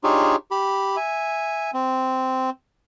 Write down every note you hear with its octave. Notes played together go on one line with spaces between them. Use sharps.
D4 D#4 F4 G4 G#4 C#5
G4 B5
E5 G#5
C4